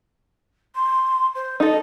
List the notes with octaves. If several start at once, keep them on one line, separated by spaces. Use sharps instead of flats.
C6
C5
D#4 A4 D#5